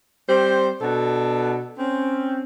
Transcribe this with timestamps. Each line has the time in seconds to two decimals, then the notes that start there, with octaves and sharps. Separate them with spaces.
0.28 G3 C4 C5
0.81 B2 D4 F#4 A4
1.78 C4 C#4